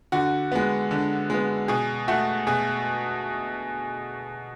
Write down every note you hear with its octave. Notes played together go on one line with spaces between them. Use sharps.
D3 F#4
G#3 B3
D3
G#3 B3
B2 G#4
A3 F#4
B2 G#4